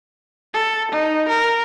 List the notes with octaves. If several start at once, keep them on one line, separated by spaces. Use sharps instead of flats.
A4
D#4
A#4